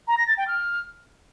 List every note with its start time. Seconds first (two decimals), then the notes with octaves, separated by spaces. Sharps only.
0.08 A#5
0.18 A#6
0.28 A6
0.38 G5
0.48 F6